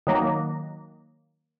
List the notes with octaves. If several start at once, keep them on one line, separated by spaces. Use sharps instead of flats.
D#3 F#3 A#3